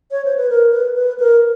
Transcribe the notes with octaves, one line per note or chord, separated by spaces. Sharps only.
C#5
C5
B4
A#4
B4
B4
A#4